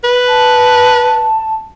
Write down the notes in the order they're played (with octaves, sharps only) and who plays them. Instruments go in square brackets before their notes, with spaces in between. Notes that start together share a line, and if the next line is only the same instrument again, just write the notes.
[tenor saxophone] B4
[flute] A5